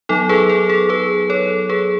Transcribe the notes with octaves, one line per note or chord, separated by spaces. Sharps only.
F#3 B3 D#4 A4
G#4 B4
A4
G#4
G#4 B4
A4 C#5
G#4 B4